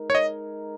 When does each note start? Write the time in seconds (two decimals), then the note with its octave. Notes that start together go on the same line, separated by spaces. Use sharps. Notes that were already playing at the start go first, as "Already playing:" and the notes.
Already playing: G#3 D#4 A#4
0.10 C#5
0.15 D#5